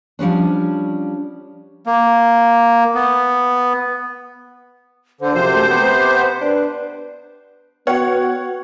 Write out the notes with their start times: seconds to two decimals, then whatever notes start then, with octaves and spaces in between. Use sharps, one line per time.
0.19 F3 G3 C#4 D4
1.86 A#3
2.95 B3
5.21 D3 C5
5.34 F#2 C3 F3 C5
5.54 A3
5.70 B3 F#5
6.41 D4 B4
7.87 B3 F#4 B4 C#5 F#5 G5